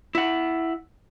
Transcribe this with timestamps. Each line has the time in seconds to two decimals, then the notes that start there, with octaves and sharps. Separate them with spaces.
0.15 E4 F#5